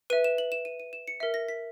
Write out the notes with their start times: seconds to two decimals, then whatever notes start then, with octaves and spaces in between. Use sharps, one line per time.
0.10 B4 E5 D#7
0.24 E7
0.38 F#7
0.52 E7
0.65 D#7
0.80 D#7
0.93 E7
1.08 C#7
1.20 A#4 E5 B6
1.34 A#6
1.48 B6